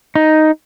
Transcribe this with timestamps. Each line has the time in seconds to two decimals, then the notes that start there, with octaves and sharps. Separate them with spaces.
0.15 D#4